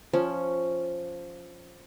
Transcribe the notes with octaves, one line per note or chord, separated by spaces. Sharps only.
F3 C#4